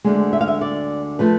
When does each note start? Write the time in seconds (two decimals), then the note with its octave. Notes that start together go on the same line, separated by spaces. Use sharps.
0.04 D2 D3 G#3
0.33 E5
0.41 F5
0.48 E5
0.61 D5
1.19 F3 A3 B4